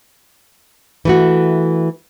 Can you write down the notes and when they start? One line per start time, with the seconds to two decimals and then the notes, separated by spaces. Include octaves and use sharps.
1.05 E3 A3 F#4